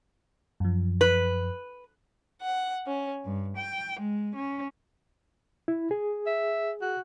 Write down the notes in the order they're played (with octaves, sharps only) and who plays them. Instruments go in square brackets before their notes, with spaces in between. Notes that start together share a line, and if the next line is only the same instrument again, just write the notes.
[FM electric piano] F#2 F3
[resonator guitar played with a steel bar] B4
[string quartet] F#5
C#4
G2
G5
G#3
C#4
[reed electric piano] E4
G#4
[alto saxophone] E5
F#4